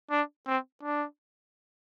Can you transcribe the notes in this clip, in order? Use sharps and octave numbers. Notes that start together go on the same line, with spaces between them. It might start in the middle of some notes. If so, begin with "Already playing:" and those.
D4
C4
D4